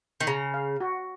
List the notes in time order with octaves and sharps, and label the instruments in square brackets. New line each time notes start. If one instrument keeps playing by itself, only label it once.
[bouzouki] D#3
[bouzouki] C#3 [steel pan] A#5
[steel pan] F5
F#4